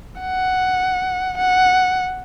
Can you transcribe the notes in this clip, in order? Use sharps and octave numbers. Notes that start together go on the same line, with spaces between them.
F#5
F#5